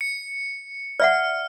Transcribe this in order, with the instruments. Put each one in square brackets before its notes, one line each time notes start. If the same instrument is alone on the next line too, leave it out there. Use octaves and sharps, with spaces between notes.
[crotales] C#7
[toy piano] D5 E5 F#5 [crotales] F6